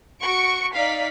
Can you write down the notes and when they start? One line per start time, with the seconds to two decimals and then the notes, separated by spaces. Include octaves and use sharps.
0.23 F#4 C#6 D7
0.74 D#4 D5 F5 B6